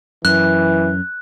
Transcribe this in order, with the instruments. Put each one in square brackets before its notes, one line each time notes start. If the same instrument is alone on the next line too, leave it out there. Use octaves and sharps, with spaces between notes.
[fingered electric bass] F#2 [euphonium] E3 [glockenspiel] F#6